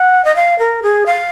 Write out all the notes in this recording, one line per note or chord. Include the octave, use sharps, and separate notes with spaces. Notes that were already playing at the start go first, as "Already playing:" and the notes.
Already playing: F#5
D#5
F5
A#4
G#4
F5